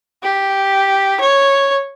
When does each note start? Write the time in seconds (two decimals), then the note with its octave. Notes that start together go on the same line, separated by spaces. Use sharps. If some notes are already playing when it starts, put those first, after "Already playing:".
0.23 G4
1.20 C#5